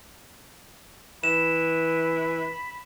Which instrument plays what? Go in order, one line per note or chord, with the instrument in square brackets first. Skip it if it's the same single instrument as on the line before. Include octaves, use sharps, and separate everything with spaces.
[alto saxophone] E3 [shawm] B5 [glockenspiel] E7